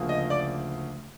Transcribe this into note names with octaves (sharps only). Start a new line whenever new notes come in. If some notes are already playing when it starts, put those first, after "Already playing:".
Already playing: D2 C#3 F3 A#3
D#5
D5